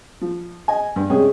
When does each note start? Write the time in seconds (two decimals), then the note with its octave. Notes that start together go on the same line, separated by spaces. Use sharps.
0.21 F3
0.68 D#5 G#5
0.96 G2
1.10 C3 G3 G#3 C#4 G#4